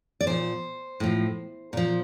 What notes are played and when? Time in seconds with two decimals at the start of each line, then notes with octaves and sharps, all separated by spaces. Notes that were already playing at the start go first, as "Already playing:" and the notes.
0.21 D5
0.27 A#2 F3 C5
1.00 A2 F3
1.73 A#2 F3